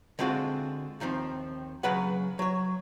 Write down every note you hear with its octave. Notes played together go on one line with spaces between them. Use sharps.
D3 G#3 C4 F4 F#4
D#2 D#3 F3 C4
C#3 F#3 B4 F#5
F#3 C#5